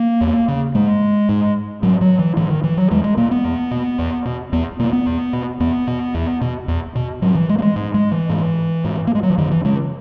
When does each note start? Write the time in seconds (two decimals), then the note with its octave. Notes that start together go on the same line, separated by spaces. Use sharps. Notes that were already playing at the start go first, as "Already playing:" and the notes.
Already playing: A#3
0.21 E2
0.48 C#3
0.75 G#2 G#3
1.29 G#2
1.83 G#2 F#3
2.01 F#3
2.19 E3
2.37 G#2 E3
2.50 D#3
2.64 E3
2.77 F#3
2.91 E2 G#3
3.04 G#3
3.17 B2 A#3
3.31 B3
3.44 E2
3.71 B2
3.99 E2
4.25 B2
4.52 E2 B3
4.79 B2 A#3
4.93 B3
5.06 E2
5.33 B2
5.60 E2 B3
5.87 B2
6.14 E2
6.41 B2
6.68 E2
6.96 B2
7.22 G#2 F#3
7.35 E3
7.49 G#3
7.58 A#3
7.62 G#3
7.76 G#2
7.94 G#3
8.12 E3
8.29 G#2
8.84 G#2
9.07 A#3
9.15 G#3
9.23 F#3
9.30 E3
9.38 F#2 D#3
9.52 E3
9.65 C#3 G#3